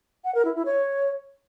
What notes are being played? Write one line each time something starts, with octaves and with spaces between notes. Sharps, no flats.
F#5
A#4
E4
E4
C#5